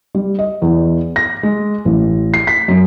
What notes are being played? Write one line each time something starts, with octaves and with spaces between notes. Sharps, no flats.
G3
D#5
E2
A#6
G#3
A1
C7
B6
F#2